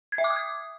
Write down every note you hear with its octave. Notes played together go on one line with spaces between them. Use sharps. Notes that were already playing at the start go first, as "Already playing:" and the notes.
G#6
E5
D6
D#6
G#6